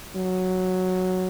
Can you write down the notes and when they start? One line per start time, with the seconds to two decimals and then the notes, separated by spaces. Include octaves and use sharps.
0.16 F#3